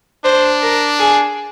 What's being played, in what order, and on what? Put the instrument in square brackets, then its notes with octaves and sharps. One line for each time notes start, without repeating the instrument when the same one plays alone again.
[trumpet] D4 [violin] C5
[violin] A#4
G#4